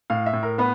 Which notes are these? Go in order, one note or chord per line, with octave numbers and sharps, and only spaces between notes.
A2 F5
E5
A2
A#4
B3 B4